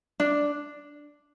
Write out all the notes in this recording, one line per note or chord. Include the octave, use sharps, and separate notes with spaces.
D4